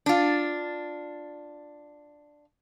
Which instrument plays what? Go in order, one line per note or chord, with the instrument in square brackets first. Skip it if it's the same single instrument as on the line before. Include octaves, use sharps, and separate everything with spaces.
[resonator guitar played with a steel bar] D4 F4